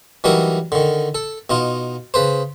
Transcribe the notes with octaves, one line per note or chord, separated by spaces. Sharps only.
E3 F#3 G3 D#4 E4 A#4
D3 D#3
A4
B2 D#4 F4
C#3 B4 C5